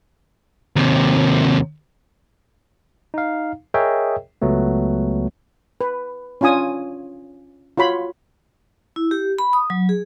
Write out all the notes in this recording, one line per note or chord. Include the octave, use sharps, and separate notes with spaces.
D#2 C3
D#4 F5
G#4 A#4 C#5 D#5 E5 G5
C#2 F#3 A3 B3
B4
C#4 D4 F4 G#5 D#6
F4 F#4 C#5 B5 C6
E4
G4
B5
D#6
F#3
G#4